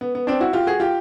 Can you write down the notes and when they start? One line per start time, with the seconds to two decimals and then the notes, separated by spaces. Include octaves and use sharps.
0.01 B3
0.15 B3
0.27 C4 D4
0.40 E4 F#4
0.53 F4 G4
0.67 F#4 G#4
0.80 F4 G4